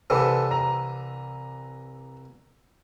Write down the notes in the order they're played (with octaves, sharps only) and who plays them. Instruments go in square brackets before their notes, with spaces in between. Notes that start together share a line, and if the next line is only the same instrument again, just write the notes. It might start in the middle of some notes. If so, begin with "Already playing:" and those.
[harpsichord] C2 C3 E3 [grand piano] A4 B4
[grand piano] A#5